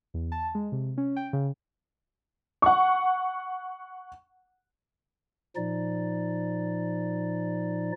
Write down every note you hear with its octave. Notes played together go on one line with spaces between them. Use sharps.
E2
A5
G#3
C3
C#4
G5
C#3
F#5 C#6
A#2 F3 D#4 D5